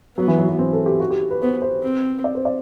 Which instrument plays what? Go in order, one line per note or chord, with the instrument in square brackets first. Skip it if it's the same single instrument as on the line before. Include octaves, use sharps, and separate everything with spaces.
[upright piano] F#3 [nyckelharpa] B3
[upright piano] E3
F#3
F#3
C4
A4
G4
F#4
G4
B4
[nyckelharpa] B3 [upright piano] C5
[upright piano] C5
[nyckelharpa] C4
[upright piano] D5
C5
D5